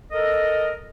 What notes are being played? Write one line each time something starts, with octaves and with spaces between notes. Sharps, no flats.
A4 A#4 D#5